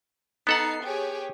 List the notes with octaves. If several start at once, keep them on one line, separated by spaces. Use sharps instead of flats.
B3 D#4 A4 F#5 C7
G4 G#4 C#5